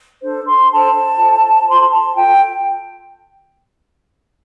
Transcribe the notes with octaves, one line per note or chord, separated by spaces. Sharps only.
D4 A4 C5
C6
D4 A4 C5 A5
F4 A4 C5
F4 A4 C5 C6
A5
F4 A4 G5